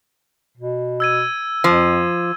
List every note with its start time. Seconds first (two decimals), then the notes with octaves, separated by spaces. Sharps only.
0.58 B2
1.00 E6 G#6 D#7
1.64 F2 F3